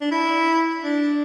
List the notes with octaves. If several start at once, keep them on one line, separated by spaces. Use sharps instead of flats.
D4
E4
D4